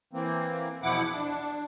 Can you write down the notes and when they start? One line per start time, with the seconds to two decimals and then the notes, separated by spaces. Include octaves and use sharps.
0.13 E3 A#3 C4
0.83 E2 B2 F3 E4 F#5 D6
1.12 D4